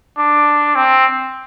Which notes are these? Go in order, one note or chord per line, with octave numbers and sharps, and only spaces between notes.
D4
C4